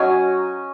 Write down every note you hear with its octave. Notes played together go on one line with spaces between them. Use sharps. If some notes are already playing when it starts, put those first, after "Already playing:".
Already playing: F#3 C#4 D#5 G#5